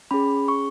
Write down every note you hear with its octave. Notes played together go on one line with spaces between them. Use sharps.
C#4 G#4 B5
C#6